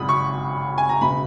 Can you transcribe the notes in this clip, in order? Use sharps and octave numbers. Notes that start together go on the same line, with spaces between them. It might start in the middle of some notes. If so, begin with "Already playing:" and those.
Already playing: G#1 F#2 C#3 G#3 B5 D#6
C#6
G#5
A#5
E1 C#3 B5